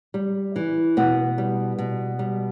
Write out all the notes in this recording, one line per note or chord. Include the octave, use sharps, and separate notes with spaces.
G3
E3
B2 B3
G3
B2
G3